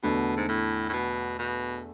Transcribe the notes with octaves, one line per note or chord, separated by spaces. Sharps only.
E2 B2 D3 A3 D4 A4
G#2
A2
A2
B2
B2